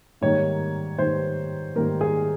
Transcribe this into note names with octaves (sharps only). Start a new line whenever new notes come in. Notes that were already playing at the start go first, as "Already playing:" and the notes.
G#2 D#3 G3 A#3 C#5
G#2 D#3 G3 A#3 C5
G#2 D#3 G3 A#3 A#4
G#4